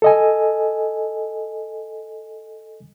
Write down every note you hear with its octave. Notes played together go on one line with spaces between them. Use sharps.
A4 D#5 G#5